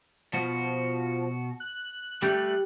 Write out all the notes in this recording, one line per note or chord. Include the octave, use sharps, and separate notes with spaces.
B2 F3 F#4
F#6
G3 A3 G4